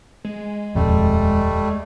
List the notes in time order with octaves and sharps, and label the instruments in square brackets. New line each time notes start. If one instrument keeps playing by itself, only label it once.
[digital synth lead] G#3
[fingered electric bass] D#1 F2 [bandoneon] G3 A3